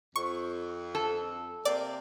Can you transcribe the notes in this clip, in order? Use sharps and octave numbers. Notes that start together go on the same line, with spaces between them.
F2 C#6
A4
C3 A#3 D5